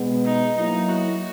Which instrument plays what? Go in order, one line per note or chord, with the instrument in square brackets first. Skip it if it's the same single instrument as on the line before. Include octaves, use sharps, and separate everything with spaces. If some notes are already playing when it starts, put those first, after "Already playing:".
Already playing: [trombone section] B2 G#3 B3
[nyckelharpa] D#4
[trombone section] F#3 A#3 E4 [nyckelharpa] D#4
[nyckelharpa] F#4